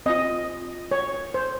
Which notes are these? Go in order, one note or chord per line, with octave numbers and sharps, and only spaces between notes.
C4 F4 D#5
C#5
C5